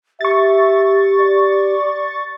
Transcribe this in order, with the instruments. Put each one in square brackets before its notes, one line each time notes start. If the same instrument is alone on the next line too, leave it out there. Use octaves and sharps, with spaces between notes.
[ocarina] G4 [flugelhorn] E5 [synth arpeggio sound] C#6 A6
[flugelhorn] D5